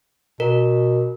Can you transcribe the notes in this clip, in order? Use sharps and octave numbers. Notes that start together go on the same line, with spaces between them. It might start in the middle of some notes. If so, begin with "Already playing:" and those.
B2 A#4